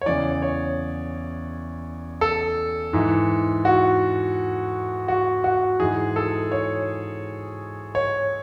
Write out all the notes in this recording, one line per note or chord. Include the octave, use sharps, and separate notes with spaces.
C#5
E2 C#3 E3 D5
C#5
A4
G#2 E3
F#4
F#4
F#4
G#2 E3 G#4
A4
C#5
C#5